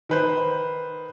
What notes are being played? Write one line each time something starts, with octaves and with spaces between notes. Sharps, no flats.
D#3 B4 C5